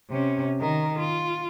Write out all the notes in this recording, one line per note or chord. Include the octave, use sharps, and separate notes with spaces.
C3 C#4
D#3 A#4
F4